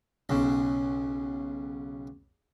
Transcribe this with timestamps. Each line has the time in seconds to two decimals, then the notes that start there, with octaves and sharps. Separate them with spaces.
0.29 B1 C#3